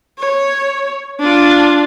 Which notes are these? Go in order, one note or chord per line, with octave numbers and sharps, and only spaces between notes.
C#5
D4 F4